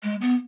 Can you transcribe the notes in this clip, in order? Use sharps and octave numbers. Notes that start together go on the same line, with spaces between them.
G#3
B3